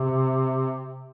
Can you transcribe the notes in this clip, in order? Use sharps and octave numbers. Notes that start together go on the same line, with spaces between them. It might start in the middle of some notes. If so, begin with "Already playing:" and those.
Already playing: C3